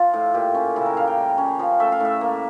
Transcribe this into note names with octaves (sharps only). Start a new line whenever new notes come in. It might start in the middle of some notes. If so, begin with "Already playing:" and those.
Already playing: F3 F4
A2
A#2 G4
C#4
C#3 E4
A#4
C#3 F5
G5
G3
C#4
F3
A3 E5
F5
A2 E5
A#3